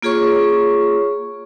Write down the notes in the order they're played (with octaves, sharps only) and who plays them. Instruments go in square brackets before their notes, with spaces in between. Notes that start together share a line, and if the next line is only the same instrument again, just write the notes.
[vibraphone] A#3 F4 G#4 C#5 C#6